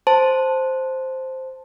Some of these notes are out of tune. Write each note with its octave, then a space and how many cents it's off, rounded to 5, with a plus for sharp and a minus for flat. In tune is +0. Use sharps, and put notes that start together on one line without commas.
C5 +0 A5 +0